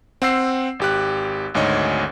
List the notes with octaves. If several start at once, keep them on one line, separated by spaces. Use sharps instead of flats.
C4 F#5 E6 C7
G#1 G4 F#6
G#1 D2 G#2 C#5 D#5